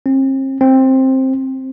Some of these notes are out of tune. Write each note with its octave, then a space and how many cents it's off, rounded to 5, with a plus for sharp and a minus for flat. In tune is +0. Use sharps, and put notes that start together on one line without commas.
C4 +40
C4 +10